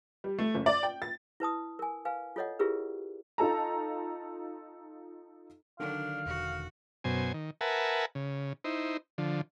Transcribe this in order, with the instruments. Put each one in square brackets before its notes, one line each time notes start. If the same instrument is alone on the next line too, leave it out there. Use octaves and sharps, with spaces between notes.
[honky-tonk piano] G3
A3
F#1
D5
G5
A6
[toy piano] E4 B4 A5 D#6
A#4 G#5
B4 F5 G#5
F4 A4 C#5 D#5 F#5
E4 F4 G4 G#4 A#4 B4
[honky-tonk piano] D#4 F4 A4 A5 A#5
[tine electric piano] D3 D#3 [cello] F#3 D4 [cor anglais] F5
[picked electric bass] E1 [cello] F#4
[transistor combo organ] F#2 B2 C5 G#5
D#3
A#4 B4 E5 F#5 G#5 A5
C#3
D#4 E4 C5
D3 F3